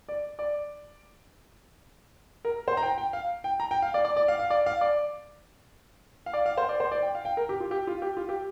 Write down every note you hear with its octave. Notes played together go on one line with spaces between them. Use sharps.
D5
D5
A#4
C5
A#5
G5
G5
F5
G5
A#5
G5
F5
D5
D5
D5
F5
F5
D5
F5
D5
F5
D5
F5
C5
D5
C5
D5
G5
F5
G5
A#4
G4
F4
G4
F4
G4
F4
G4